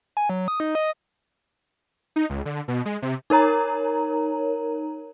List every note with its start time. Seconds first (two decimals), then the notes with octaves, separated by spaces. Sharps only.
0.17 G#5
0.29 F#3
0.48 D#6
0.60 D#4
0.75 D#5
2.16 D#4
2.30 C#2
2.45 D3
2.68 B2
2.85 G#3
3.02 C3
3.30 D#4 A#4 C#5 A#5